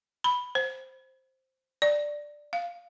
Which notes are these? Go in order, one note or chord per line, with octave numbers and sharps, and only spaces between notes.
B5
C5
D5
F5